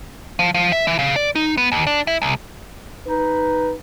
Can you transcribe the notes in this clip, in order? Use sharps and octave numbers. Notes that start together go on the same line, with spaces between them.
F3
F3
E5
E3
C#3
D5
D#4
B3
D#2
D4
E4
C2
D#4 B4